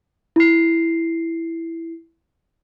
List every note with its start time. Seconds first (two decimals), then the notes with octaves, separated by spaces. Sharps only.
0.36 E4 C7